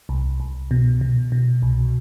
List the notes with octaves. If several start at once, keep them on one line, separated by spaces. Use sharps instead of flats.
C2
C2
B2
B2
B2
C2